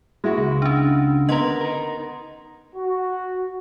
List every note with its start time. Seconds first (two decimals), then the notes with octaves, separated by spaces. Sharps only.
0.24 G#3 E4 F#4
0.38 C#2
0.62 C#4 D4
1.29 D3 B3 A#4 D#5 F#5 C6
1.61 D#4 A#4
2.76 F#4